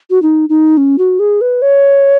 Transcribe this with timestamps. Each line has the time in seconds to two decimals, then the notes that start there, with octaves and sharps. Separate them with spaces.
0.10 F#4
0.22 D#4
0.49 D#4
0.77 C#4
0.98 F#4
1.19 G#4
1.41 B4
1.62 C#5